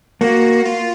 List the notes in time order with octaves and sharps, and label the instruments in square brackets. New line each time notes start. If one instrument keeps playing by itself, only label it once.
[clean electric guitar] A#3 [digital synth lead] F#4
[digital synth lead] F4